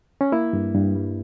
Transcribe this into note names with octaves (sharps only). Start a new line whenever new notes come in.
C#4
A#3 E4
G2
G2
G3